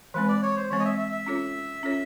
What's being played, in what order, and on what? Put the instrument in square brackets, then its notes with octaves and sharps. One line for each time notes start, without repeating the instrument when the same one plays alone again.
[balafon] E3 G#3 C4 [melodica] B4
[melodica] D5
C#5
C5
[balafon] E3 G#3 C4 [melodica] C#5
[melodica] D#5
E5
E5
E5
[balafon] C#4 F4 A4 C#5
C#4 F4 A4 C#5